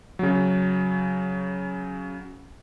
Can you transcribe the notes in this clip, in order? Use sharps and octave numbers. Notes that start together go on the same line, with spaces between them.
C#3 F#3